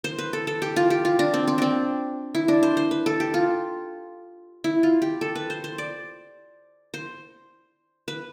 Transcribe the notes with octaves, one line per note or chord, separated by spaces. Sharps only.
C5
B4
A4
A4
G4
F4
G4
F4
D4
C4
C4
C4 D4
E4
D4
C5
C5
B4
A4
G4
F4
E4
F4
G4
A4
B4
C5
C5
D5
C5
B4